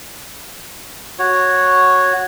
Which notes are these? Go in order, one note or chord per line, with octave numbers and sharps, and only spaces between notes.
F#4 C#5